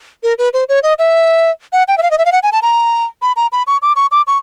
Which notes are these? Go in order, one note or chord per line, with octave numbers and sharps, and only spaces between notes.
A#4
B4
C5
C#5
D#5
E5
F#5
G5
E5
F5
D#5
E5
F5
F#5
G#5
A5
A#5
B5
A#5
B5
C#6
D6
C#6
D6
C#6